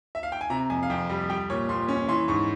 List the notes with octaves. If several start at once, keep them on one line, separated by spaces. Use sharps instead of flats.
E5
F5
G5
G#5
C3 A#5
F2 G#5
F5
F2 G5
G3
G3 G5
A#2 C#5
A#2 C6
C#4
E3 C6
G#2 C#6